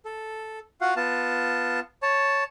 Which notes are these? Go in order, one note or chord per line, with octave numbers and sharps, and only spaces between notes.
A4
F4 F#4 F5 F#5
B3 F4 A5
C#5 A5